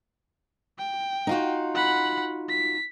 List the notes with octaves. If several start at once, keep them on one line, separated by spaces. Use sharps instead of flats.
G5
D#4 F4 F#4
F#5 B5
B6